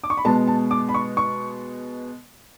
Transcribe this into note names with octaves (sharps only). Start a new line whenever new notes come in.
D6
C#6
B5
B2 G#3 B3 A5
A5
D6
B5
C#6
C#6